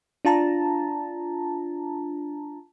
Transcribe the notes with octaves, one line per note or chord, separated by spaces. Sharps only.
D4 F4 A5 A#5